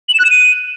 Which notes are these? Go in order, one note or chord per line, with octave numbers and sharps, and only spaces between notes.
F#7
E7
F#6
E7
D#7